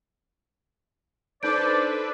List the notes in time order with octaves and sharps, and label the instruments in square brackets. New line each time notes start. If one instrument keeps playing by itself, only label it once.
[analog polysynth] D4 A4 B4 [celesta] D#4 G6 D7 [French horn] C5 [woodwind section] D5